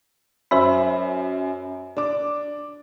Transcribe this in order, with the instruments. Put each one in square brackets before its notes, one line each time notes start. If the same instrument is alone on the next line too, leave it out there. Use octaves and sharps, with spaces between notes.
[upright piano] F#2 [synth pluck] C5 E5 B5
[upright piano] D4 D6